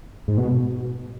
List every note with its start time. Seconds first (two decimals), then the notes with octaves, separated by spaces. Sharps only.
0.28 G#2
0.38 B2